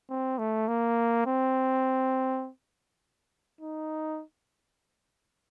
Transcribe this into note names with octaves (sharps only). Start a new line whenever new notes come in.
C4
A3
A#3
C4
D#4